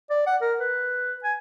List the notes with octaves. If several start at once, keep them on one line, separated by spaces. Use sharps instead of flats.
D5
F#5
A#4
B4
G#5